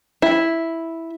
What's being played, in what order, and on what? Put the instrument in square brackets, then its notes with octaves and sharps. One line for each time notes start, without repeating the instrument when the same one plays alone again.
[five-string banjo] E4